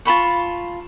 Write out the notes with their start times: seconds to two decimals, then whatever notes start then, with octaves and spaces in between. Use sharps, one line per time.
0.05 F4 A5 B5 C#6